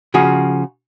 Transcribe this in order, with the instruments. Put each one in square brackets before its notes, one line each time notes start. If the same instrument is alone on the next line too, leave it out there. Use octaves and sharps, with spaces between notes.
[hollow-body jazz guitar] C#3 F3 F#4 G#4